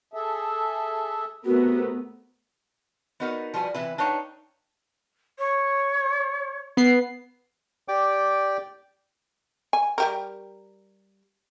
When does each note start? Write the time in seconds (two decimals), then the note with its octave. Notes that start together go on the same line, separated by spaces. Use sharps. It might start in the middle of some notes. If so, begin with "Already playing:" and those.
0.14 G#4 A4 E5
1.45 C3 A3 B3 F#4 A#4
3.20 B3 D#4 F#4 A#4 B4
3.54 F3 G3 F#4 B4 G#5
3.74 C3 E3 E4 B4
3.98 D4 D#4 B4 C#5 F5 G5
5.39 C#5
6.77 B3 C7
7.88 G4 D5 G5 D6
9.73 G#5
9.98 G3 G4 A#4